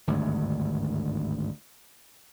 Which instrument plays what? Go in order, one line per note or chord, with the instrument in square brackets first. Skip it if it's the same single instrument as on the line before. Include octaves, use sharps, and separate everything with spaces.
[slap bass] G#1 D2 G2